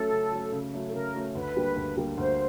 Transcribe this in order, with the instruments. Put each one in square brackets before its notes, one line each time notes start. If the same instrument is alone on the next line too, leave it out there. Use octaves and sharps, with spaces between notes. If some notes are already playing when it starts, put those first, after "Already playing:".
Already playing: [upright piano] F#3 A3 C#4 [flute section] A4
[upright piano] C#3
F#3 A3 C#4
C#3
F#3 A3 C#4
[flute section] A4
[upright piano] C#3 [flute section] A#4
[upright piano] F#3 A3 C#4
[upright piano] D2 [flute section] B4
[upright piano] D3 G3 A#3
D2
D3 G3 A#3
[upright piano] D2 [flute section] C5